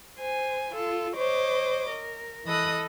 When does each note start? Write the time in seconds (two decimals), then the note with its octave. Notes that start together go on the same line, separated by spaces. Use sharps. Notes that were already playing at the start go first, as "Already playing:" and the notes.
0.17 C5 G#5
0.74 F4 A4
1.16 C5 C#5 D#5 D6
1.89 A#4
2.45 E3 A4 D#5 B5 D#6 F#6